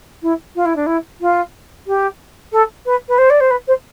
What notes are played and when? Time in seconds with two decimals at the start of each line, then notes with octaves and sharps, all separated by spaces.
0.22 E4
0.55 F4
0.65 E4
0.75 D4
0.86 E4
1.21 F4
1.87 G4
2.52 A4
2.85 B4
3.08 B4
3.18 C5
3.30 D5
3.40 C5
3.50 B4
3.67 C5